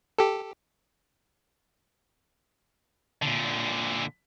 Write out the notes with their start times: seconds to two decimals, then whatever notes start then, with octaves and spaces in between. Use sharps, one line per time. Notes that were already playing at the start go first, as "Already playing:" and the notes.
0.19 G4 A4
3.22 A#2 D3